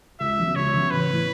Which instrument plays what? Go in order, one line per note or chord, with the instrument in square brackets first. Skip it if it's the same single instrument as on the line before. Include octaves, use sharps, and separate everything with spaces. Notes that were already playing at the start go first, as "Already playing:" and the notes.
[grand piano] C#2 [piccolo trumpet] E5
[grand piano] C#3 F#3 B3
[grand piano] C#2 [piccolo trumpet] C#5
[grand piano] C#3 F#3 B3
[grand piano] A1 [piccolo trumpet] B4
[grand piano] A2 E3